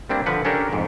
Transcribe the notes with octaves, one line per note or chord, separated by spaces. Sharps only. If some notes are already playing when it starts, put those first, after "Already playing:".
G3 A#3 C4 D4 E4
D3 F3 B4 F#5
C#4 D4 G4 A4 A#4
F2 G#2